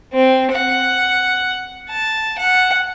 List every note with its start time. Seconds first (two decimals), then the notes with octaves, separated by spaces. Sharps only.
0.13 C4
0.51 F#5
1.89 A5
2.38 F#5